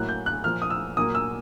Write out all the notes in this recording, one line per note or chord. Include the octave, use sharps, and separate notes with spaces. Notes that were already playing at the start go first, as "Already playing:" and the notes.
Already playing: A2 F#3 A#3 F#6
G6
F#6
A#2 F3 A#3 F6
D#6
E6
A#2 F#3 A#3 D#6
E6